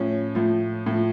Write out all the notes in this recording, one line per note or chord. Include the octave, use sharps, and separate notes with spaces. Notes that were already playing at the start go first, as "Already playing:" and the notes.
Already playing: A2 F3 C#4
A2 F3
A2 F3